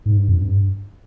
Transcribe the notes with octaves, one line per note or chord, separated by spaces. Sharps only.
G#2
G2
F2
G2